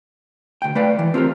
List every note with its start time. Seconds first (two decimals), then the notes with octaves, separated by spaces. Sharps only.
0.62 D2 G5
0.75 A3 B4 D5 F5
0.99 E3
1.14 C4 F4 G4 A#4